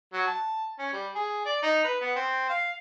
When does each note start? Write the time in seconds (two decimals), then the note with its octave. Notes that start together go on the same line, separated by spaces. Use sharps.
0.13 F#3
0.27 A5
0.78 C#4
0.93 G3
1.15 G#4
1.45 D5
1.63 D#4
1.84 B4
2.00 B3
2.16 C4
2.49 F5